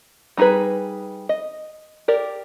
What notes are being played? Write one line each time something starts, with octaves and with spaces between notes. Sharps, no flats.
G3 D#4 F#4 G#4 B4
D#5
G4 A#4 D5